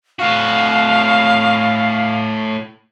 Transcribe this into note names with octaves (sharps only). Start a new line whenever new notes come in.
A2 F#4 F5